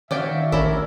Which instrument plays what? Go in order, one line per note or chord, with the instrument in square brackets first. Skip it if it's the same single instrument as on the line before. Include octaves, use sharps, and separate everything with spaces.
[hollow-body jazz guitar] D#3 F5 [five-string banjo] C#4 D5 G5 [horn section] F#4 C#5 E5
[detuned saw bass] A1 [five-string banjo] C#4 E4 E5 [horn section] D4 A#4 D5